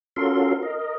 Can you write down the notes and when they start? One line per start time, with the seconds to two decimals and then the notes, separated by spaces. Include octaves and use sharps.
0.16 C#4 F4 F#4 A4 A#4 C6
0.63 A#4 D#5